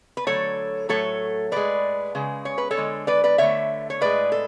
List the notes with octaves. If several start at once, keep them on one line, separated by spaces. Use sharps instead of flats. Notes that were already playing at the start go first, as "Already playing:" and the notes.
B4
D3 F#3 A3 A4 C#5
A2 F#3 A3 A4 C#5
A2 G#3 B4 D5
C#3 G#3
C#5
B4
A4 C#5
D3 G#3
B4 D5
B4 D5
D3 A3 C#5 E5
C#5
A2 G#3 B4 D5
A4